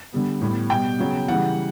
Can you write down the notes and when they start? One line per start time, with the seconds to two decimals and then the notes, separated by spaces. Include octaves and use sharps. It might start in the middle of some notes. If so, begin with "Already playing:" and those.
0.13 D3 G3 B3
0.41 A2 G3 B3
0.70 B2 G3 B3 G5
0.99 C#3 F#3 B3
1.28 C#3 E3 G3 F#5